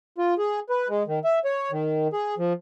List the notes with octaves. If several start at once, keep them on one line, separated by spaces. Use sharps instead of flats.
F4
G#4
B4
G#3
D#3
E5
C#5
D#3
G#4
F3